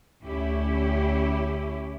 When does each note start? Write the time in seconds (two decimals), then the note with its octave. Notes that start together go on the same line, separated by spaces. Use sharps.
0.23 D2 C#4 E4 G4